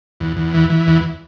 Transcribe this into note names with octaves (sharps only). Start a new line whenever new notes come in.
E2
E2
E3
E3
E2